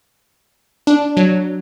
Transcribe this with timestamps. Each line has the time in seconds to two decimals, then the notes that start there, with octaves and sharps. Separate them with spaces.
0.87 D4
1.17 F#3